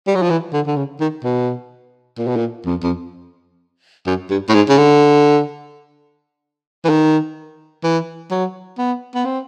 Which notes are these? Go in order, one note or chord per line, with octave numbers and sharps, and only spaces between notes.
G3
F#3
F3
E3
D3
D3
C#3
D#3
B2
A#2
B2
A#2
F2
F2
F#2
G2
A2
G#2
C#3
D3
E3
D#3
E3
F#3
B3
B3
C4